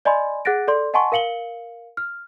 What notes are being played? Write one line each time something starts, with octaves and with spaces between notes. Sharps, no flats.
D5 D#5 G#5 B5 C6
G#4 F#5 F#6 A6 A#6 D7
A4 D5 C6
D#5 F#5 G#5 A5 C6 C#6
A#4 F5 C#7 F#7 G7
F6